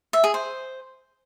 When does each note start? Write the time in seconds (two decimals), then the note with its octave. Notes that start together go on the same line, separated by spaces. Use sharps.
0.13 E5
0.24 G#4
0.34 C5